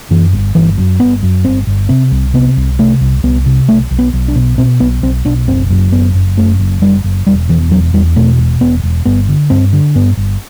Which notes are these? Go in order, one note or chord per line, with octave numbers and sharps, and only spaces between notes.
F#2 E3
G1
G1 E3
F#2
G1 B3
F#2
G1 C4
G1
C3 C4
C2
C3 B3
C2
C3 A3
C2
C2 B3
C3
B1 A3
B1
B3
B1
D4
B2
B2 C4
B1 B3
B1 C4
B1 D4
F#1 C4
F#2
F#1 B3
F#1
F#2 A3
F#1
F#1 G3
F#1
E1 G3
E2 E3
E1 F#3
E2 G3
B2 A3
E1
E1 B3
E1
G1 B3
D3
G2 C4
D3
G2 B3
G1